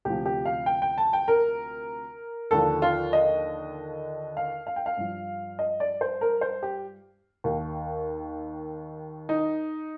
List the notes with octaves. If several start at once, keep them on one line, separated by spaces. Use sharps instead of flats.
D2 C3 F3 G4
G4
F5
G5
G5
A5
G5
A#4
D#2 D3 F3 A4
F4
D#5
F5
F5
G5
F5
G2 F3
D#5
D5
C5
A#4
C5
G4
D#2 D#3
D#4